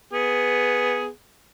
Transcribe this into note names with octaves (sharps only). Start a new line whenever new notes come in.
B3 G#4